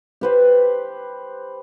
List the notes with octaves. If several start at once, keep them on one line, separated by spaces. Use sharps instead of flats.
G4 B4 C5